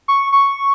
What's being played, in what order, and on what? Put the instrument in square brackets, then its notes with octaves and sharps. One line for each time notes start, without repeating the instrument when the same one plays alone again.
[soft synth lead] C#6
C#6